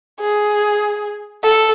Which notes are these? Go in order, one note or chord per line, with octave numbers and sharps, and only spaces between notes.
G#4
A4